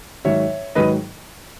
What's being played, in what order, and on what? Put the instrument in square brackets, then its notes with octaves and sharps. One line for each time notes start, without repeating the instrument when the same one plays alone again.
[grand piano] G#2 D#3 F#3 C#5 E5
G#2 D#3 F#3 B4 D#5